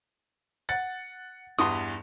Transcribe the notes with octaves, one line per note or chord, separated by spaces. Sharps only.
F#5 A6
E2 G2 E3 C6 D#6